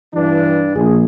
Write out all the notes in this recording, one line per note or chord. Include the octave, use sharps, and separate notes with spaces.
G2 E3 D4
A#1 G#4